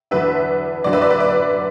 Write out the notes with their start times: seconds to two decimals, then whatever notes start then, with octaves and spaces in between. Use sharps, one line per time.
0.11 E2 D3 F#3 D4 B4 E5
0.84 F#2 D3 F#3 D5
0.93 B4 E5
1.02 D5
1.11 B4
1.20 D5